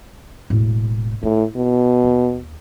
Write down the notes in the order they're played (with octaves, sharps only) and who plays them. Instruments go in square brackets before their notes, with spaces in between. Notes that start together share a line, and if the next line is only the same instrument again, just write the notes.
[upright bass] E1 A2
[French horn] A2 [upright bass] E4
[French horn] B2
[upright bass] D#2